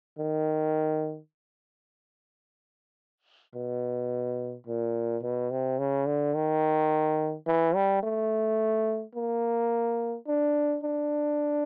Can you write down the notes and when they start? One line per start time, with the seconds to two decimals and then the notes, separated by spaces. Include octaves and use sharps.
0.18 D#3
3.55 B2
4.67 A#2
5.22 B2
5.51 C3
5.79 C#3
6.06 D3
6.35 D#3
7.47 E3
7.75 G3
8.03 A3
9.15 A#3
10.28 D4
10.83 D4